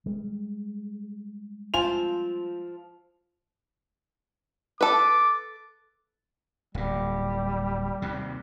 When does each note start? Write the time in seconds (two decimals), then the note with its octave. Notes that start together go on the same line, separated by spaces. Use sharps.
0.06 G3 G#3
1.74 F3 C4 F4 G#5 F7
4.81 A4 B4 D6
6.75 D1 A#2 G3
8.02 D#2 C3